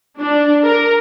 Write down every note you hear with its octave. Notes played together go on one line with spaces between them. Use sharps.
D4
A#4